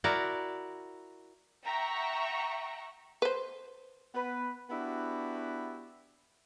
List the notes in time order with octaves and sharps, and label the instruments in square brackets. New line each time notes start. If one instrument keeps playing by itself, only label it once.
[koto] E4 F#4 A#4 D5
[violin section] E5 F#5 G5 A#5 C#6
[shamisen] B4 C5
[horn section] B3 B4
B3 D4 E4 F#4 G4